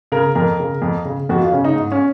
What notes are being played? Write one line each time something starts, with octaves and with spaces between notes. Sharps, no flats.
C#3 A#4
F2 A#4
C#3
F2
C#3
F2 F#4
F4
C#3 C#4
D#4
G#2
C#4